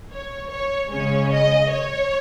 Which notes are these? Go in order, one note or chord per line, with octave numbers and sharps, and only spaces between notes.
C#5
C#5
C#3 G#3 C#4 C#5
D#5
C#5